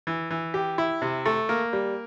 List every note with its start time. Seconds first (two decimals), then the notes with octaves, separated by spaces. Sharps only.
0.07 E3
0.31 E3
0.54 G4
0.78 E4
1.02 C3
1.26 A3
1.49 A#3
1.73 G3